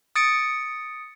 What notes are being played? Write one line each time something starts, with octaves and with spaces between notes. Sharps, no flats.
D#6 A6 C#7 D7